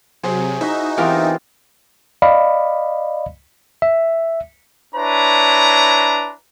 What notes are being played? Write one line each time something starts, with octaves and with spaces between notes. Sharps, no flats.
C3 F#3 G#4 C5
D#4 E4 F#4 D#5 E5
E3 B3 C4 F4 G4 A#4 E5
D5 D#5 F5 B5
E5
D4 E4 B4 C#5 A#5